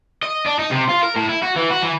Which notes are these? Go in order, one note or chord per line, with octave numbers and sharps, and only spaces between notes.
D#5
D4
D#4
C3
F4
A#4
A2
E4
F#4
E3
F#4
E3